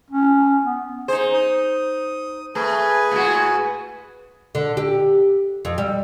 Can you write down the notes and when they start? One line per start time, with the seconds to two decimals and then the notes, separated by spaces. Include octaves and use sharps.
0.11 C#4
0.65 B3
1.08 D#4 G#4 C5
1.33 D#6
2.55 A3 G#4 B4 G#5
3.12 A2 G#3 F#4
4.55 D3
4.77 G4
5.65 F2
5.78 G3